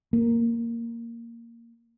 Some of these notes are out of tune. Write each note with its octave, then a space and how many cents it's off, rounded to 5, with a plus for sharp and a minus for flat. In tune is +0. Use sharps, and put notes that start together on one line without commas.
A#3 -5